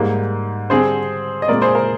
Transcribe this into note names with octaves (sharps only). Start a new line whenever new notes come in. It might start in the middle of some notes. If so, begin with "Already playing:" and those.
Already playing: G#2 G3 A#3
D3 G3 C4 G#4 C5
D#5
A#2 G#3 C4 A#4 D5
G#4 C5
A#4